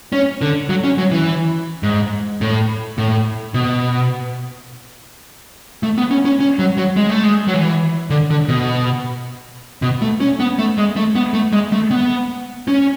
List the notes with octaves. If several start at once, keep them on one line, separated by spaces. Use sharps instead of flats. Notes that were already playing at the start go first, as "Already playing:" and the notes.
C#4
D3
F#3
C#4
F#3
E3
G#2
A2
A2
B2
A3
B3
C#4
C#4
C#4
F#3
F#3
G#3
A3
G#3
F#3
E3
D3
D3
B2
B2
A3
C#4
B3
A3
G#3
A3
B3
A3
G#3
A3
B3
C#4